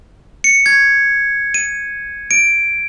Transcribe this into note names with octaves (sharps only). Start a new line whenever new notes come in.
C#7
G#6
D#7
D7